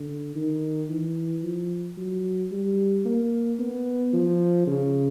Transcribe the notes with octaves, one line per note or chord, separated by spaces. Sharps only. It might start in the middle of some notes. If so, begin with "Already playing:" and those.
Already playing: D3
D#3
E3
F3
F#3
G3
A#3
B3
F3
C#3